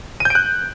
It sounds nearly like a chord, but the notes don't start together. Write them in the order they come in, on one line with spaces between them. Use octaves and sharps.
D#7 G6 D7 F#6